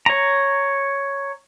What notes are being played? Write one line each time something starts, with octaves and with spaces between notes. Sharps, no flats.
C#5 A#5